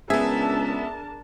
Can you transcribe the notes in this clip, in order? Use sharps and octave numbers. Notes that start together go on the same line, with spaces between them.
C#2 B3 D4 G#4 A#4 E5 A5